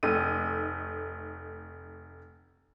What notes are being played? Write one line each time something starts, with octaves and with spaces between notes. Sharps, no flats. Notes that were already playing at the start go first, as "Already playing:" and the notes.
F1 A3 D#4 D#7